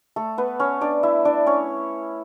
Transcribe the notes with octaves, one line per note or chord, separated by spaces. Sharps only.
A3 A4
B3 B4
C#4 C#5
D4 D5
E4 E5
D4 D5
C#4 C#5